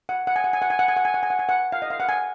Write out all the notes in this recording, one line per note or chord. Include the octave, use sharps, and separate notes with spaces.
F#5
F#5
G#5
F#5
G#5
F#5
G#5
F#5
G#5
F#5
G#5
F#5
G#5
F#5
G#5
F#5
F5
D#5
F5
F#5
G#5